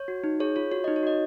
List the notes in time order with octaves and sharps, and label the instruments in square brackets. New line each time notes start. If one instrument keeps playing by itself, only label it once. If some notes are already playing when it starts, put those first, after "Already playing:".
Already playing: [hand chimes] C#5
F#4
D#4
G#4 C#5
F4 C#5
F#4 C#5
D#4 D#5
C#5
F#4 D#5